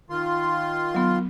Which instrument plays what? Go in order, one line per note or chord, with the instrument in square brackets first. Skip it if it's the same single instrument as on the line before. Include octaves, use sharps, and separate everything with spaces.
[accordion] D#3 F4 C6
[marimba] F#3 B3